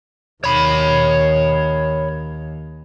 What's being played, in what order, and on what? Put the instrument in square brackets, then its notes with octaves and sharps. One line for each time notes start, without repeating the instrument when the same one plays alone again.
[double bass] D#2 [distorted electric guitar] C#5 B5